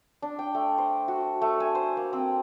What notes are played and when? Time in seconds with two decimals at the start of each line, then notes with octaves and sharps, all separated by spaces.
0.22 D4
0.39 G5
0.55 A3
0.78 C5
1.08 F#4
1.42 A3
1.60 G#5
1.75 C5
1.97 A#3
2.13 C4